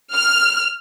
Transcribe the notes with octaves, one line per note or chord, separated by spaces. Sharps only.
F6